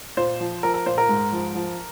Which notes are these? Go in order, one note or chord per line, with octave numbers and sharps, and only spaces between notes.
A#2 C5
F3
F3 A#4
A#4
A#2 C5
A#4
G#2
F3
F3